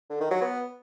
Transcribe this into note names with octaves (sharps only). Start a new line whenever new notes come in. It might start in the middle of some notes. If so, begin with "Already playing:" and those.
D3
D#3
F#3
B3